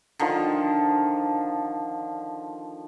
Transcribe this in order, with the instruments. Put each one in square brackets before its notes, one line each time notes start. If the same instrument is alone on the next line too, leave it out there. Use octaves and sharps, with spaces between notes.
[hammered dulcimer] D3 D#3 F3